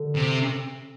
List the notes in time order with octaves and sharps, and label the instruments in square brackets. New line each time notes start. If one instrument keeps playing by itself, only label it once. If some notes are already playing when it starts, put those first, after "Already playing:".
Already playing: [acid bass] D3
[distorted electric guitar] C3